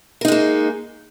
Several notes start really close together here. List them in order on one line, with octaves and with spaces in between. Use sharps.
A#4 D#4 G#3 A#3